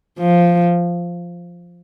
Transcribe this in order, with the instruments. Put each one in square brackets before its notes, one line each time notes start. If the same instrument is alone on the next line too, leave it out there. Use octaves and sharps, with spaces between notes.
[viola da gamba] F3